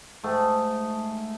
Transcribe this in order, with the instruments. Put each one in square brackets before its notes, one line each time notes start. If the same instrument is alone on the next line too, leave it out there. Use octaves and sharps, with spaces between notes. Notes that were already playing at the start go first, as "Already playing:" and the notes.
[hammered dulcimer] G#2 A3 G#4